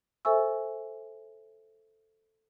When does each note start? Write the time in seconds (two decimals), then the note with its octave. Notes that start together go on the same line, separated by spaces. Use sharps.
0.25 A4 C5 E5 G#5 C#6 E6